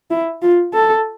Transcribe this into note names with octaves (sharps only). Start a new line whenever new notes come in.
E4
F4
A4